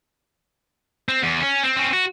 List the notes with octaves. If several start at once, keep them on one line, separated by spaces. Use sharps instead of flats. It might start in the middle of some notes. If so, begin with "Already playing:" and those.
C4
E2
C#4
C4
C4 C#4
F#4